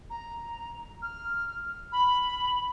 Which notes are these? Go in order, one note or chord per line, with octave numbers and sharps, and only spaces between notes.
A#5
F6
B5